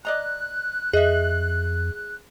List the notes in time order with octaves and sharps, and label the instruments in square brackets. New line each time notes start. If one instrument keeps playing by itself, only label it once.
[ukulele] D5 D#5 A#5 [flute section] F#6
[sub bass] F2 [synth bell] G#4 [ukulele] D#5 E5